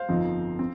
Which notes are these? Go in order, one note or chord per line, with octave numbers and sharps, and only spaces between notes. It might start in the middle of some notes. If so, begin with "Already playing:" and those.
Already playing: C5 F5
G1 F2 F3 C4 D#4
C4